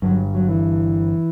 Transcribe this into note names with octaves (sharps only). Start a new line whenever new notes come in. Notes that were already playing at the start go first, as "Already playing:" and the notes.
G1 G2 F#3
F#3
E3